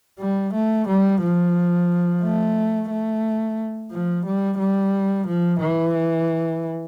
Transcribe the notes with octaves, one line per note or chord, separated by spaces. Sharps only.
G3
A3
G3
F3
A3
A3
F3
G3
G3
F3
E3